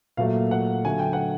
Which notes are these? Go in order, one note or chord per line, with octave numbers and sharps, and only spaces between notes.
A#2 F#3 A3 F5
F#5
D3 F#3 A3 G#5
G5
F#5